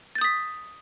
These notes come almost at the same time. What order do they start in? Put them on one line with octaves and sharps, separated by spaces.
A6 G6 D#6 B6